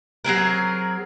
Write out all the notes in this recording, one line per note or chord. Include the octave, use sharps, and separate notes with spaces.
F#3 C4 G#4 A#4